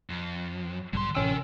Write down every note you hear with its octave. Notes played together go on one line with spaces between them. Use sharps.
F2
B1 G#2 D3 G3 C6
A1 C3 C#4 A#4 G5 E6